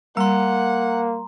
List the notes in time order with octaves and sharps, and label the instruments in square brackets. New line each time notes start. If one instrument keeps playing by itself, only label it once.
[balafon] G3 [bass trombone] A#3 [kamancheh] F#5 [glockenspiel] A#5 C6